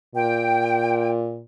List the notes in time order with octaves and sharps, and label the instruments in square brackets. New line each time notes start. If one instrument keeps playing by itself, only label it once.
[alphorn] A#2 [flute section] G5